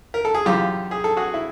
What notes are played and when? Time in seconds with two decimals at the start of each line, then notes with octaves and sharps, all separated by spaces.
0.14 A#4
0.25 A4
0.34 G#4
0.45 F#2 C#3 E3 F4 G4
0.91 G#4
1.04 A4
1.17 F#4 G#4
1.34 E4